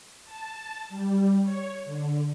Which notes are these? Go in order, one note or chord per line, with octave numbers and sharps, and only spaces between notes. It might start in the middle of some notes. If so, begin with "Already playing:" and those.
A5
G3
C#5
D3